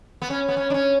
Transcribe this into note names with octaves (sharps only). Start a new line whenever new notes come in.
B3
C#4
B3
C#4
D4
C#4